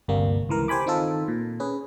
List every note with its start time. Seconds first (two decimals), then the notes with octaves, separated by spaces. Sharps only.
0.08 G1 D2 C3 G3 A#3
0.49 C#2 E3 A#4
0.68 G4 C5 G#5 B5 D6
0.86 D#3 C4 D#4 F4 A4
1.28 A#2
1.60 C#4 G#4 B4